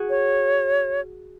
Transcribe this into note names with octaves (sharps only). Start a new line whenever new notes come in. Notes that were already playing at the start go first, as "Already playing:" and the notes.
Already playing: F#4 G#4
C#5